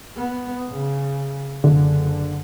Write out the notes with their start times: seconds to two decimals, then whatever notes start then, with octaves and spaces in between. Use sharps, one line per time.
0.16 B3
0.70 C#3
1.64 F#1 D3